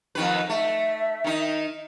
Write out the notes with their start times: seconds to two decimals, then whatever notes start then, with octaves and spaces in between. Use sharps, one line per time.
0.15 F2 D#3 B4
0.50 A3 E5
1.24 D#3 D#4